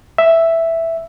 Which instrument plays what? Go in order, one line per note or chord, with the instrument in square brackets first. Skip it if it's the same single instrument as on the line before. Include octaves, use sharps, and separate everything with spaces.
[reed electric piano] E5